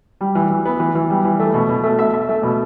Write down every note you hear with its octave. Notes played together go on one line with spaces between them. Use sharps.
G3
E3
E3
B3
E3
E3
G3
E3
A3
B2
B2
A3
E5
E5
A3
B2